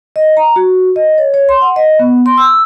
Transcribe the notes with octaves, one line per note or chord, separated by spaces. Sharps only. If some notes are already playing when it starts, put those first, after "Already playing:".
D#5
A#5
F#4
D#5
C#5
C#5
C6
F#5
D#5
B3
C6
E6